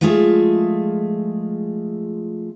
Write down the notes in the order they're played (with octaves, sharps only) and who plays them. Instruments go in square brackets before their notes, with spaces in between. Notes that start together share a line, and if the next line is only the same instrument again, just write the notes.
[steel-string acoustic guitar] F3 G#3 A3 F4 G#4 E5